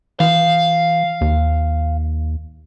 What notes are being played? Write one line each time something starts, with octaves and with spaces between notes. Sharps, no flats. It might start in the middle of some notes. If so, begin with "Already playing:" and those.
E3 F5
D#2